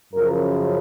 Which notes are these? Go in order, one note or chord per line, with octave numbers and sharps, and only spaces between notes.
F#2 C#3 F3 A#4